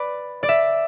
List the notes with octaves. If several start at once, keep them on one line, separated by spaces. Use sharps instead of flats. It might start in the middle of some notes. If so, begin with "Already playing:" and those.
Already playing: B4 D5
D5
E5